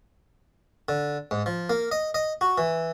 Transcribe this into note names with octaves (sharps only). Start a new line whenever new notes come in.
D3
G#2
F3
A#3
D#5
D#5
F#4
E3